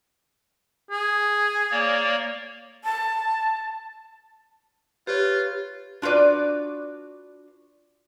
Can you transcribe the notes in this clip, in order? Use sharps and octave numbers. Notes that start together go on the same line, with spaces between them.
G#4
A#3 C#5 D5
A5
F4 G4 B4 C#5
D4 F4 F#4 B4 D5